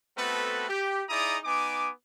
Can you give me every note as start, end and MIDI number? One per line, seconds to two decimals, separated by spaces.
0.16 0.65 57
0.16 0.65 59
0.16 0.65 60
0.16 0.65 66
0.16 0.65 69
0.16 0.65 71
0.69 1.02 67
1.08 1.37 63
1.08 1.37 64
1.08 1.37 68
1.08 1.37 74
1.08 1.37 82
1.08 1.37 87
1.44 1.90 59
1.44 1.90 63
1.44 1.90 80
1.44 1.90 86